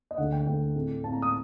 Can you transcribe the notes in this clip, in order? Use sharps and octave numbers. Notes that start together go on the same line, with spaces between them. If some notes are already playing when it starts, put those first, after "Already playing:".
D#5
D2 D3 A3 F#5
G5
D2 D3 A3 G5
A2 A3 C4
A2 A3 C4 A5
A#5
D#6